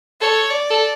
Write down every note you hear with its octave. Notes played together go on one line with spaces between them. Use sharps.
A4 C#5
D5
A4